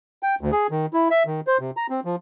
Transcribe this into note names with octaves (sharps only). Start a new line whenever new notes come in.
G5
D2
G#4
D#3
E4
E5
D#3
C5
C3
A#5
C4
F3